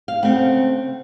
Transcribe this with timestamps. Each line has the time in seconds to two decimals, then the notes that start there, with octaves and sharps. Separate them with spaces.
0.08 F5
0.22 C#3 A3 C4 F#5